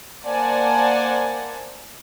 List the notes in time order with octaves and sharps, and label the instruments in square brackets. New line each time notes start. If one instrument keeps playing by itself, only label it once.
[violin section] A#3 C5 D5 F#5 G#5 A5